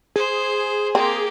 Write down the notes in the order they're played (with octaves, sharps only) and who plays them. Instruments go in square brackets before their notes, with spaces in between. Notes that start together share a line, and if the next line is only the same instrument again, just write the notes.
[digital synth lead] G#4 [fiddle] C5
[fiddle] A#3 G4 [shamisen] C4